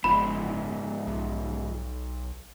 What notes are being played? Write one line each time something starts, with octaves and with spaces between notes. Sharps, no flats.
F#1 G#2 F3 B3 B5
B1